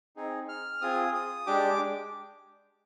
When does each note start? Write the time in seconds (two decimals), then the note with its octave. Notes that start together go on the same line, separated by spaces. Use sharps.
0.16 C4 D#4 G#4
0.49 F6
0.82 C4 F4 G#4 D#6
1.14 D#6
1.47 G#3 D4 G4 D6